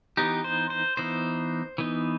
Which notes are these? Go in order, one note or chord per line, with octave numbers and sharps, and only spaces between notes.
E3 B3 D#4 G4
C5
C5
E3 B3 D#4 C5
E3 B3 D#4